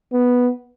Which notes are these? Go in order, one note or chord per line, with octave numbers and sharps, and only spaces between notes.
B3